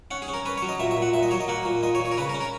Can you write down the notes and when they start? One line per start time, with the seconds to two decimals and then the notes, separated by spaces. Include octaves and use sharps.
0.11 C#4 F#5
0.22 G#4
0.28 C#4
0.34 A#4
0.45 C#4 B4
0.57 C#5
0.62 F#3
0.69 D#5
0.80 A#2 E5
0.91 E5
0.97 A#2
1.02 F#5
1.14 A#2 E5
1.23 D#5
1.31 F#3 C#5
1.40 D#5
1.48 A#3 F#5
1.65 A#2
1.83 A#2 D#5
1.95 C#5
2.00 A#2
2.05 C#5
2.12 A#4
2.17 C#3 B4
2.29 A#4
2.34 C#4
2.41 A#4